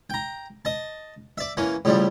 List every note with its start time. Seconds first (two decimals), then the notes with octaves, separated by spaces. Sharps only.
0.10 G5 A#5
0.65 D#5 A5
1.38 D5 E5
1.57 E3 A#3 C#4
1.85 A2 C#3 F3 G3